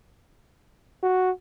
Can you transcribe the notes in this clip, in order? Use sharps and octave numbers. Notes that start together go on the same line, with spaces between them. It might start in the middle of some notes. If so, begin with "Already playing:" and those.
F#4